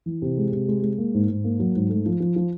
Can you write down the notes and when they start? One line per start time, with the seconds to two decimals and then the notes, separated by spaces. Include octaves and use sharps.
0.06 E3
0.22 C3
0.38 G#3
0.52 C3
0.68 G#3
0.83 G#3
0.98 A#3
1.14 G#2
1.29 G#2
1.44 A#3
1.60 F#3
1.76 G#2
1.90 A3
2.06 F3
2.20 F3
2.36 F3